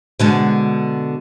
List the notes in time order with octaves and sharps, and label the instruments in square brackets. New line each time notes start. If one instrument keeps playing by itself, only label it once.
[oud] B2 D3 G#3